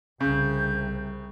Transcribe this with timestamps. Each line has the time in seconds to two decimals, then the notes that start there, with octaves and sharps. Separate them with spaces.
0.20 C2 C#3 G6